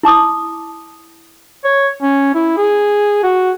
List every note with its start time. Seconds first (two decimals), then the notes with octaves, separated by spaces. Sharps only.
0.03 E4 A5 D6 D#6
1.64 C#5
2.02 C#4
2.35 E4
2.57 G#4
3.24 F#4